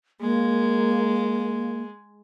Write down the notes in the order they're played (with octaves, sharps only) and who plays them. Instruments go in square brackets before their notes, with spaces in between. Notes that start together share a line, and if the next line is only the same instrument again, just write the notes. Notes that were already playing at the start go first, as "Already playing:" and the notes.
[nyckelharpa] G#3 [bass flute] A#3